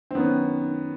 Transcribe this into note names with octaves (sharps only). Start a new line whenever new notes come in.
C4
F#2 D#3 B3